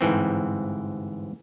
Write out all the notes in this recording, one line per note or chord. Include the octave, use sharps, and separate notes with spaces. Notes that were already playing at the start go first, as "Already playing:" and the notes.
G1 G#2 E3 C4